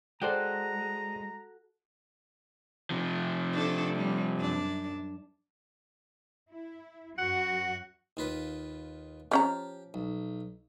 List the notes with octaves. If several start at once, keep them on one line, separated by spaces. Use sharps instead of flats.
G#3 F#4 A4 C5 D5 G5 A#5
C3 F3
D4 A4
G3
F#2 D4
E4
F#2 F#4 F#5
D#2 F4 B4
F3 C#4 G4 A#5
B1